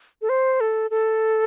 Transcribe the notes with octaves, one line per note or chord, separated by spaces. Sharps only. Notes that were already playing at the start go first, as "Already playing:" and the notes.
A4
C5
A4
A4